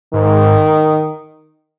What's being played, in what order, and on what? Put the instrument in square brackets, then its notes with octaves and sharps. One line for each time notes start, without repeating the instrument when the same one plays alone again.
[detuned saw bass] G#2 [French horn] D#3